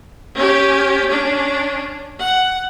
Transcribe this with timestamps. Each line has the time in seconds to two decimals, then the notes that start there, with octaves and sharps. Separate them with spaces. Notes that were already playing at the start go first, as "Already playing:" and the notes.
0.35 C#4 G4
1.08 C#4 D4
2.19 F#5